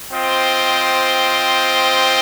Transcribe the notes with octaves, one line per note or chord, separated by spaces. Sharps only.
C4 F4 C5 D#5 G5